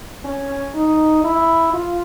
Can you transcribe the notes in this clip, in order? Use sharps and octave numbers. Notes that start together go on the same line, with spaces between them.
C#4
D#4
E4
F4